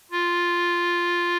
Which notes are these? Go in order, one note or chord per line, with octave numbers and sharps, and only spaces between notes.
F4